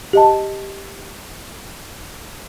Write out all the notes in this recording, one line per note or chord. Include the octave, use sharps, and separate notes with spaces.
G4 D#5 A5